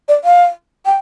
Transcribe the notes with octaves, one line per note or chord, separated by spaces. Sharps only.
D5
F5
G5